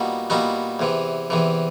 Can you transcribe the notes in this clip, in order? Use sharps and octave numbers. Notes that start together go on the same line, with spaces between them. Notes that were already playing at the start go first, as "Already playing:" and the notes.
Already playing: A#2 G3 B3 D#4 F#4
A#2 G3 B3 D#4 F#4
E2 C3 E3
E2 C3 E3